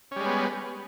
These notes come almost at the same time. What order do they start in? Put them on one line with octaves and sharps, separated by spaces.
C#4 G3 G#3 B3